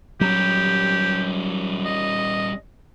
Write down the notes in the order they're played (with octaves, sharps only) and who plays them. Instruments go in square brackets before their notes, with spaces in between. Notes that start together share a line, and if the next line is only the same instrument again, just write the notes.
[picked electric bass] F#3 [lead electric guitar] G3 C#4 [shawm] G4
[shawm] D#5